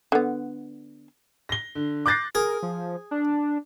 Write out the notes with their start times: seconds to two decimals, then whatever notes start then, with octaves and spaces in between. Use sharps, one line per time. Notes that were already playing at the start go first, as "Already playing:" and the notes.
0.12 D3 B3
1.49 A#6 G7
1.75 D3
2.06 D6 F#6 G6 A6 A#6 C7
2.35 G#4 A#4
2.63 F3
3.11 D4